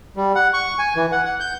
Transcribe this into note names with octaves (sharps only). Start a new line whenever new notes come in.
G3
F#5
C#6
G#5
E3
F#5
F#5
G6